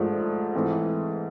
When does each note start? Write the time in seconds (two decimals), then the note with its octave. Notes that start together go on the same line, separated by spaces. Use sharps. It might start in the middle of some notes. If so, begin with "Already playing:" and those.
Already playing: G#2 F3 A3 D4
0.54 G#2 E3 A3 C4